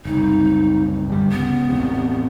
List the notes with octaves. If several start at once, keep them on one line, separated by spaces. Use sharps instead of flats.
F#1 C2 D#4
G1 G3
C#2 B3
A1 E2 C3